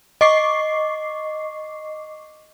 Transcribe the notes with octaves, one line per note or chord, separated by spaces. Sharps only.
D#5 C#6 D6 C7